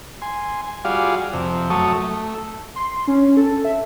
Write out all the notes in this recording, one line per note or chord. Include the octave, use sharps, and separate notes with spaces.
G#5 C6
G3 F4 F#4 G#4 D5 F5
F2 C3
F#2 F#3 A3 A5 C#6 D#6
A3
C6
C#4
A4
E5